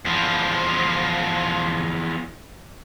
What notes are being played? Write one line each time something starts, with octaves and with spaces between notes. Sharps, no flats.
E2 F3